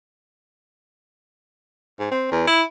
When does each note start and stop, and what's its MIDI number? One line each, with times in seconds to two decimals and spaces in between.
1.99 2.08 44
2.11 2.28 60
2.32 2.47 40
2.47 2.62 64